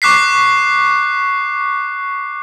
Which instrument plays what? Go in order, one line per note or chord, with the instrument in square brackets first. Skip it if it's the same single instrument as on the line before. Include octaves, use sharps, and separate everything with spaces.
[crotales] C#6 D6 F#6 B6 C7